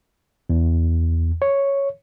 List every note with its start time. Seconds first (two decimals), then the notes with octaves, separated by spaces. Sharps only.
0.50 E2
1.42 C#5